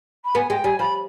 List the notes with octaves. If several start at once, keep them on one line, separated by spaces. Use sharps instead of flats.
B5
B3 G#5
G#3 G5
G3 G#5
F3 B5